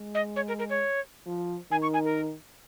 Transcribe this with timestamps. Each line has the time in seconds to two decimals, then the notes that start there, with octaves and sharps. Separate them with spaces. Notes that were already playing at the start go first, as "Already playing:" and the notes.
Already playing: G#3
0.15 D#5
0.36 C#5
0.48 A#4
0.59 A#4
0.70 C#5
1.26 F3
1.71 D#3 G#5
1.82 C#6
1.94 G#5
2.04 A#4